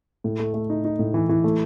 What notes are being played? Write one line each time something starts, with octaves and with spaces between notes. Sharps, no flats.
A2
A3
A3
D#4
D#4
A2
E3
E3
A3